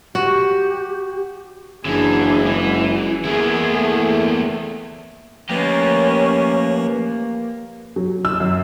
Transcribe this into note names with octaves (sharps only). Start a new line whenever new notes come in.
F#4 G4
F#1 F#2 E3 D4 G#4
E3 G#3
E2 E3 A#3 E4 G#4
A3
F3 A3 A#3 C#4 G4 B4
F#3
E6
F#2